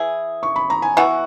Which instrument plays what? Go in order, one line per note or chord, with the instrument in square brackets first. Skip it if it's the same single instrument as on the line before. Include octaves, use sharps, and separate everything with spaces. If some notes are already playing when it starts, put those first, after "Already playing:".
Already playing: [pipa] E3 E4 G#4
[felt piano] C#6
B5
A#5
G#5
[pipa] E3 B3 F#4 [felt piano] F#5